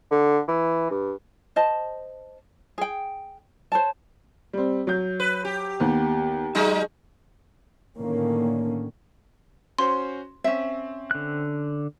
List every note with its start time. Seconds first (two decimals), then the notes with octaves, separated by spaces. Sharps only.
0.11 D3
0.48 E3
0.90 G2
1.56 C5 D#5 A5
2.78 G#4 G5
3.72 C5 C#5 A5
4.53 G3 C4
4.87 F#3 G6
5.20 B4
5.45 G4
5.80 D#2 B3
6.55 F#3 G#3 D#4
7.96 A2 D3 D#3 A#3 C#4
9.79 C#4 F#4 C5 C6
10.44 C4 C#4 E5
11.11 D3 F#6